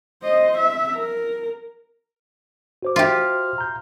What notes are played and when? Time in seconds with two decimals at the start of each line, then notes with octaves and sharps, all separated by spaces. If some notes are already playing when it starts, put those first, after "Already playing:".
0.23 C5 D#5
0.58 E5
0.95 A#4
2.83 F#4 C5 D6
2.96 F4 G4 E5 F5 C6
3.58 A#5 G6